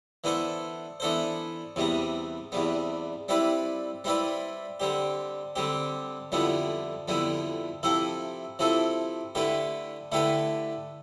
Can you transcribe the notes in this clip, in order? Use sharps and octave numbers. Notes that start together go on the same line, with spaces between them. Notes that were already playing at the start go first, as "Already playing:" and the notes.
E3 B3 D4 A4 C5
E3 B3 D4 A4 C5
E2 C3 G3 B3
E2 C3 G3 B3
G3 C4 E4 B4 D5
G3 C4 E4 B4 D5
D3 G3 C4 G4
D3 G3 C4 G4
F2 D3 G3 B3 E4
F2 D3 G3 B3 E4
C3 F3 C4 E4 A4
C3 F3 C4 E4 A4
D3 A3 E4 G4 B4
D3 A3 E4 G4 B4